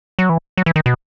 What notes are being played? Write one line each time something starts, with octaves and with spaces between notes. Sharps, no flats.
F#3
E3
F#3
E3
D#3
B2